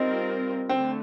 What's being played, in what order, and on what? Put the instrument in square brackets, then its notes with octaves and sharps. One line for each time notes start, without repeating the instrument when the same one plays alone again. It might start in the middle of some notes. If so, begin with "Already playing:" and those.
Already playing: [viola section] G3 C4 F4 A#4 [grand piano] D#4
[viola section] D3 A3 [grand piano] C4